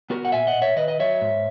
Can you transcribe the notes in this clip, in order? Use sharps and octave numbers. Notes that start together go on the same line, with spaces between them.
B3 F#4 A#4
F#5
A#2 E5 G#5
D#5 F#5
A#2
C#5 E5
D#3 B4 D#5
D#5
F#3 C#5 E5
G#2